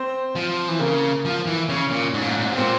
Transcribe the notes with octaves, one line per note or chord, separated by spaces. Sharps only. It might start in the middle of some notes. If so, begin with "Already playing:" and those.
Already playing: C4 C5
F3
E3
C#3 A#3 A#4
F3
E3
C#3 C#4 C#5
A#2
G#2
A#2
G#2
A#2
G#2
C3
A#2 C4 C5